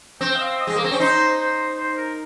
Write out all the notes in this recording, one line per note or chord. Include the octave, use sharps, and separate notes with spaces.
C4 G5
D#5
F5
D#5
G#3
A#3
C4
C#4
D#4 C5
C5
C5
A#4